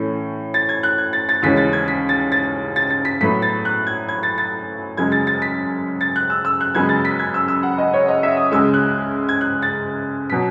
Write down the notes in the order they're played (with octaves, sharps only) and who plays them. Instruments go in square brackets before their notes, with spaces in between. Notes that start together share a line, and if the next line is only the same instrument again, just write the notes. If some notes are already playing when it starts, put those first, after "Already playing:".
Already playing: [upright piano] A2 E3 C#4
A6
G#6
F#6
G#6
A6
A6
D#2 C#3 E3 G#3 C#4 B6
A6
G#6
B6
A6
A6
A6
A6
B6
A2 F#3 B3 B6
A6
F#6
G#6
G#6
A6
A6
F#2 C#3 G#3 G#6
A6
A6
B6
A6
F#6
E6
E6
F#6
F#2 C#3 G#3 B3 G#6
A6
B6
G#6
E6
E6
F#5
D#5
C#5
D#5
E5
D#6
C#2 C#3 G#3 E6
F#6
G#6
F#6
A6
B2 F#3 B6